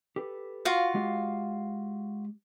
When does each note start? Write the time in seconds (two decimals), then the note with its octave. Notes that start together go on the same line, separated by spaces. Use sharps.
0.16 G4 A4 B4
0.65 F4 F#4 F5
0.95 G#3 G4